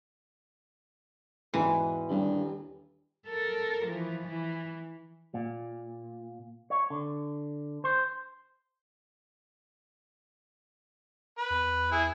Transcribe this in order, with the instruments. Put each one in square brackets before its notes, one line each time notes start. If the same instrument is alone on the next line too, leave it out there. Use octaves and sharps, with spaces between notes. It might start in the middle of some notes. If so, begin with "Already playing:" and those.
[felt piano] E1 G#2 B4 [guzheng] E3
[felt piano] D#1 G3 [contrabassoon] G2
[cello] A4 A#4
E3 F3
E3
[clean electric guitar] A#2
C#5
D3
C5
[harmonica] B4
[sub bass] E2
[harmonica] E4 G#4